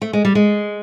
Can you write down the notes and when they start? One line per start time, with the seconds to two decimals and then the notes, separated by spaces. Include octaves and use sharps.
0.02 A3
0.13 G#3
0.25 G3
0.35 G#3